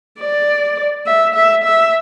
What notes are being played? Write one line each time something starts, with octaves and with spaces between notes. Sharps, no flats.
D5
E5
E5
E5